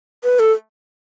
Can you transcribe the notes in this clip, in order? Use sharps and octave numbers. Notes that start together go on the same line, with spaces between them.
B4
A4